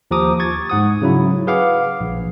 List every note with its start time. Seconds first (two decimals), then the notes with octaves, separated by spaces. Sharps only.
0.11 D#2 F3 G4 A#5 D6 D#6
0.39 C#6 G#6 A6
0.70 G#2 F#5 D#6
1.02 C#3 F#3 E4
1.47 G#4 B4 F5 F#5 D6
2.01 A#1